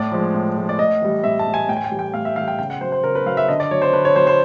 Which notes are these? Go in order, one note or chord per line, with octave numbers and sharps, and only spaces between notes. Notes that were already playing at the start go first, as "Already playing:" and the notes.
Already playing: A2 D5
F3 G#3
A2
F3 G#3
D5
A2 D#5
E3 G3
A2 E5
A5
E3 G3
G#5
A2 G5
G#5
G5
E3 G3
G5
A2 F5
E5
E3 G3 F5
G5
C#3 G5
F#5
F#3 C5
C5
C#3 A#4
B4
F#3 F5
E5
D3 D#5
D5
F#3 C#5
C5
D3 B4
C#5
F#3 C5
C5